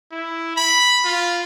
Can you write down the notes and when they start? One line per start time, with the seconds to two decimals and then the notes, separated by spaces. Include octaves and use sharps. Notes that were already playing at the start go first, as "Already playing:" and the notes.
0.12 E4
0.56 B5
1.04 F4